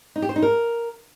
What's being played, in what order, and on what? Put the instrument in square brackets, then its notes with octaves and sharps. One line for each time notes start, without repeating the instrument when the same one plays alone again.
[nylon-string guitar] D#4
G4
C5
D#4
A#4